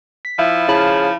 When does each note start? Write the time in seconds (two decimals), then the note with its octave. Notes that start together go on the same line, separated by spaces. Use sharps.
0.25 B6
0.39 F3 E4 E5 B5
0.68 C#3 E4 A5 B5